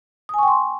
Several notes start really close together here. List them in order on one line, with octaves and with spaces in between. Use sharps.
D#6 G#5 C#6 G5 C6